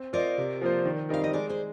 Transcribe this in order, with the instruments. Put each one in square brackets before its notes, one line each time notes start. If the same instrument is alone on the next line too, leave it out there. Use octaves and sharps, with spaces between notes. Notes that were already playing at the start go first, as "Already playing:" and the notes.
Already playing: [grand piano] C4
[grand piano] F4 C5 D#5 [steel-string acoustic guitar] A#4 D5
[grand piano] C3
F3 A#3 F4 C5
D#3
[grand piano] G3 C4 D#4 A#4 [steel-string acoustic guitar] F5
[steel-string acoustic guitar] D#5
[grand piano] G#3 [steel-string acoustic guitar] A#4 D5
[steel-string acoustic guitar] G#4 C5